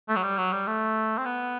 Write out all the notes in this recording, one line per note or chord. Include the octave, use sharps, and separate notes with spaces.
A3
F#3
G3
F#3
G3
A3
C4
B3